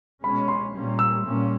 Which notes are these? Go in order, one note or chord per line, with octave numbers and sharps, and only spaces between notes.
B2 G#3 C#4 B5
C6
A#2 G3 A#3 C#4
E6
A#2 G3 A#3 C#4